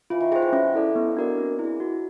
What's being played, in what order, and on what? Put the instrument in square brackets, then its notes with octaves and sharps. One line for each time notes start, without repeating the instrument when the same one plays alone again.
[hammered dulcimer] E3 [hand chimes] F4
[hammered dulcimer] D#3
[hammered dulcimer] D#3 [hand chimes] G#4 C5
[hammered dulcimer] E3
[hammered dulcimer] F#3 [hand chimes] C#4
[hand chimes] E4 A4 D5
B3
D4 F#4 A#4 D5
C4
E4 G#4
F#4